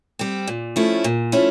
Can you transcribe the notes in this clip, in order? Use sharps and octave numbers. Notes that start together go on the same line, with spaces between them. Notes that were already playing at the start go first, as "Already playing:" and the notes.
G3 C4
A#2
F3 A3 C#4 E4
A#2
F3 A3 C#4 E4